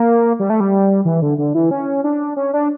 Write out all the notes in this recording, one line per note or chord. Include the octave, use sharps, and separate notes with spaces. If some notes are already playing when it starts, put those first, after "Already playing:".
Already playing: A#3
G3
A3
G3
E3
D3
D3
E3
C#4
D4
C#4
D4